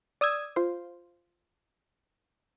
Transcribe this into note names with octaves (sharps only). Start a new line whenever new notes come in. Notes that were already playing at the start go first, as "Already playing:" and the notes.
D5 D#6 E6 G#6
F4 C5